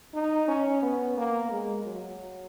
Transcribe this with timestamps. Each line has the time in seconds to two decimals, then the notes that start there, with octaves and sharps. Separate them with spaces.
0.14 D#4
0.48 C#4
0.82 B3
1.17 A#3
1.51 G#3
1.85 F#3